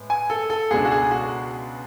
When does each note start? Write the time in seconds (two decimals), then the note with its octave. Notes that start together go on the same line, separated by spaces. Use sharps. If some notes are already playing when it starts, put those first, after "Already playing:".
Already playing: A2 G#3 B3
0.10 G#5
0.30 A4
0.50 A4
0.70 C#2 B2 G#3 D4 G#4
0.85 F#4
0.91 G#4
1.11 F#4